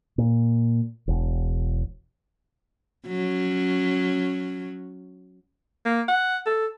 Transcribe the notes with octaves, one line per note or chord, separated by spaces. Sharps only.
A#2
E1
F#3 C#4
A#3
F#5
A4